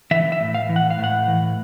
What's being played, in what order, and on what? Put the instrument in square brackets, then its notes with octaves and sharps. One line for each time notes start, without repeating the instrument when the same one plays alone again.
[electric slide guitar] E3 E5
E5
A2
F5
E3
F#5
F5
A2 F#5
E3